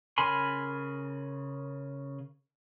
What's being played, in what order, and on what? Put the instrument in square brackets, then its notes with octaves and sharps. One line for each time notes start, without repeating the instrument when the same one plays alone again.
[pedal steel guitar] C#3 A#4 G#5 B5 C6